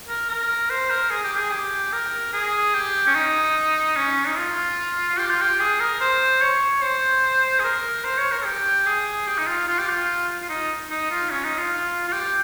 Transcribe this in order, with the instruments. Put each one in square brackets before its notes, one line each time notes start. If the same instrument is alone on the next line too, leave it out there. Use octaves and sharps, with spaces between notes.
[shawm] A#4
A#4
C5
A#4
G#4
G4
G#4
G4
A#4
G#4
G4
C#4
D#4
C#4
D#4
F4
G4
F4
G4
G#4
A#4
C5
C#5
C5
G#4
A#4
C5
C#5
A#4
G4
G#4
G4
D#4
F4
F4
G4
F4
F4
D#4
D#4
F4
C#4
D#4
F4
F4
G4